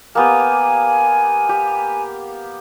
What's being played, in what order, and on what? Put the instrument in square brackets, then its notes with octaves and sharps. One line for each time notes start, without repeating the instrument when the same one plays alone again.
[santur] A#3 B3 G4 [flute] G#5
[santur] G4